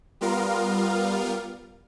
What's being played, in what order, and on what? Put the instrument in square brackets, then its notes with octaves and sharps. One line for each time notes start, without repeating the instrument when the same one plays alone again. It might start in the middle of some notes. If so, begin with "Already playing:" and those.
[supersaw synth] G3 B3 F4 A#4 F5